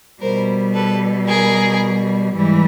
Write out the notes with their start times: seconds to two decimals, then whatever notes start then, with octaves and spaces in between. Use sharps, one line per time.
0.21 B2 G3 A#4 C5
0.74 A4 B4
1.27 G#4 A#4
2.34 G#2 E3 G3